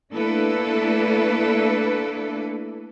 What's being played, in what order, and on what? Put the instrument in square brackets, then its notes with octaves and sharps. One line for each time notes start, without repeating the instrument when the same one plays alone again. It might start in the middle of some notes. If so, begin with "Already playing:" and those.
[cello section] A3 A#3 D4 E4 A4 B4